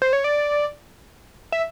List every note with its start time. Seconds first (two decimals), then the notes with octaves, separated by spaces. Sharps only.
0.02 C5
0.13 C#5
0.24 D5
1.52 E5